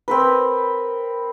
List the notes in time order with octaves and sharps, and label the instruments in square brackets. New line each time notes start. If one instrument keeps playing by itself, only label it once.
[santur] C4 A#4 B4